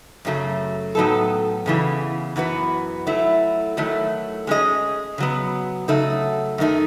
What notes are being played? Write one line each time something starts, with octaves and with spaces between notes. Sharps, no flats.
F#2 C#3 F#3 A3
A2 F#3 B3 D#4 A4
E2 C#3 E3 B3
F#2 E3 B3 F#4 B4
F#3 A3 E4
D#3 F#3 A3 E4
G#3 C#4 G#4 D#5
C#3 F#3 B3
C#3 F#3 A3 D#4 F#4
F#2 D#3 A3 D#4